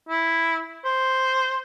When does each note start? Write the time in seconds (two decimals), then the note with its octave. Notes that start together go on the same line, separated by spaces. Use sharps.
0.09 E4
0.85 C5